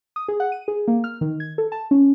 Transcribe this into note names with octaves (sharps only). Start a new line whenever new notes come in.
D#6
G#4
F#5
D#7
G#4
A#3
F6
D#3
G#6
A4
A5
C#4